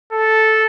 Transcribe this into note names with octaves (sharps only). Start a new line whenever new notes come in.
A4